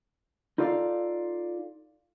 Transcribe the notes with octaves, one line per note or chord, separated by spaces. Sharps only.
D#4 F4 A4 D5 F5